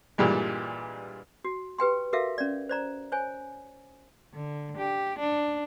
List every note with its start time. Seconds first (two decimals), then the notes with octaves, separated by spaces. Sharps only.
0.18 G2 A#2 E3 G3 G#3
1.45 F#4
1.78 G4 B4 G5 C6
2.13 F#4 A4 A#4 E5 F5
2.38 C#4 D5
2.69 C5 D5 A#5
3.12 C5 C#5 G#5
4.33 D3
4.76 G4
5.18 D4